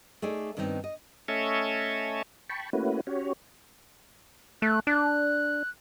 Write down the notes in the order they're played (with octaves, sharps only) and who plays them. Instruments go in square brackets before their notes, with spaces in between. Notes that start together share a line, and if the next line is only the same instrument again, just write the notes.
[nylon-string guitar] A3 D#4 G#4 D5
G2 D#3 B3 C4 D#4
D#5
[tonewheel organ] A3 C#4 A4 C#5 D#5 E5
G5 A5 B5 C#6
A3 A#3 C#4 E4 F#4 B4
C#4 F#4 G4 C#5
[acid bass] A3 [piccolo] F#6
[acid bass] D4 [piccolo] F#6